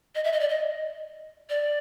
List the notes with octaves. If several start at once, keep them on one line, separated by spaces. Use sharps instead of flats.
D#5
E5
D#5
D5
D#5
D5